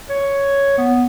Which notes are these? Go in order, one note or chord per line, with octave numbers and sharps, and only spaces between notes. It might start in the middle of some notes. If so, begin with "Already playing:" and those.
C#5
B3